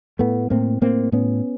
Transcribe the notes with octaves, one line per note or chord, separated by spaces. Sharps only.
A2 A3 B3
A2 A#3 C4
A2 A#3 C4
A2 B3 C#4